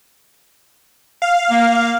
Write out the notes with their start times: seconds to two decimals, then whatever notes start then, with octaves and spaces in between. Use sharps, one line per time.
1.22 F5
1.51 A#3